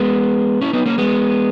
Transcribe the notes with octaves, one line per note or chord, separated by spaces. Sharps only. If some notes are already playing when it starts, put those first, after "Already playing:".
Already playing: G#3 B3
C#4 E4
B3 D#4
A#3 C#4
G#3 B3